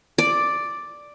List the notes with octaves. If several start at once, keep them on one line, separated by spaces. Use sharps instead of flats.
D5